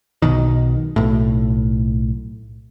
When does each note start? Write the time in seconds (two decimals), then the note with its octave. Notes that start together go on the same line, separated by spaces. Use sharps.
0.22 B1 B2 D#3
0.96 B1 A2